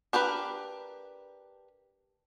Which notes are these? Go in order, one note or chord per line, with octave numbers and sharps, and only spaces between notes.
D4 G4 A#4 B4